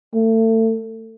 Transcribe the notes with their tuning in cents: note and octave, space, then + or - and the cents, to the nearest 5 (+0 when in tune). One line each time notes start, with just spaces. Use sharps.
A3 +30